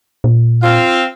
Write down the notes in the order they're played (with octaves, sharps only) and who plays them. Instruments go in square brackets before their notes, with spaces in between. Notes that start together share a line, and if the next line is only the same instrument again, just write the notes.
[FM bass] A#2
[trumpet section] C4 F5 [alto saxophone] F4